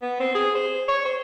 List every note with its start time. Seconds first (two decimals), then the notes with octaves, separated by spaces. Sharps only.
0.02 B3
0.20 C4
0.35 G#4
0.55 C5
0.88 C#5
1.05 C5